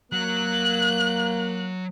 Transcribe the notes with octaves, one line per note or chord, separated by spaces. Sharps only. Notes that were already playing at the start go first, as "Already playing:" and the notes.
F#3 A#3 F#6